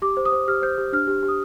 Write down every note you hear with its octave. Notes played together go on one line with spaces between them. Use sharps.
G4 D6
C5
D#6
C5
G4 F6
C5 G6
G4
D4 F6
G4
G4
D#6